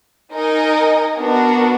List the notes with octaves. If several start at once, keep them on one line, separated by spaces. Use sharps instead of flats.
D#4 A#4 D#5 G#5
B3 D4 F#4 A#4